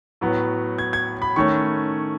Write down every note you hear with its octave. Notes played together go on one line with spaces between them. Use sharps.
A2 F#3 B3
G#6
G#6
B5
D#3 A3 C#4 C#6